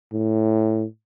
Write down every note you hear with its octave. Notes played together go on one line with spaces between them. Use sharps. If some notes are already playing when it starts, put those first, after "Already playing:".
A2